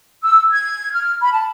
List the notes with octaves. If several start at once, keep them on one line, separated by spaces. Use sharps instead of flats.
E6
G#6
F6
B5
A5